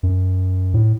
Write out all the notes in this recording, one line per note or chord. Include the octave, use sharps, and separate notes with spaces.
F#2
A2